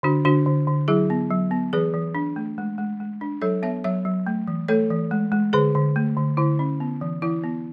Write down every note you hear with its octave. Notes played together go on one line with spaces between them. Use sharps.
D3 D4 F#4
D3 D4 F#4
D3
D3
F#3 E4 G#4
B3
F#3
B3
E3 G#4 B4
E3
D4
A3
G#3
G#3
G#3
D4
F#3 A4 C#5
B3 C#5 E5
F#3 C#5 E5
F#3
A3
E3
A3 A4 C#5
E3
G#3
G#3
D3 G#4 B4
D3
A3
D3
D3 E4
C#4
B3
E3
E3 E4
B3